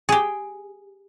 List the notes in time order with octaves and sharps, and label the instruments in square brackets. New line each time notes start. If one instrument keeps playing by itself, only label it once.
[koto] G4 G#4